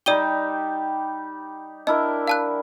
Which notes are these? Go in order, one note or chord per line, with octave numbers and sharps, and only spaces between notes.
G3 D#4 G4 D5 D#7 G7
D4 E4 A#4 D#5
F5 A5 F#6